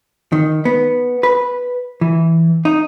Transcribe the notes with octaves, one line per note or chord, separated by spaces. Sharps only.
D#3
B3
B4
E3
D#4